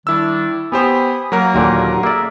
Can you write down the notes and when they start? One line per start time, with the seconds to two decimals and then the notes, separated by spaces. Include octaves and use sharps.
0.07 D#3 G3 D4 E4 E6
0.72 B3 G4 C5 G#5 B5 D#6
1.32 F#3 A#3 F#4 A#4
1.54 D#2 A#2 D3
2.03 A#3 G#4 A4 D5 E5